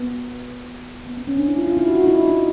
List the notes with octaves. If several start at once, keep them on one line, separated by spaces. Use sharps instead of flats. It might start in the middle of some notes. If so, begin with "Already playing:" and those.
Already playing: B3
B3
C4
C#4
D4
E4
F4
F4
E4
F#4
D#4
E4
D#4